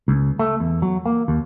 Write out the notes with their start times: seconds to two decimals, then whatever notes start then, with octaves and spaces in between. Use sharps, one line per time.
0.08 C#2
0.39 A3
0.60 E2
0.82 F#3
1.06 A#3
1.28 D#2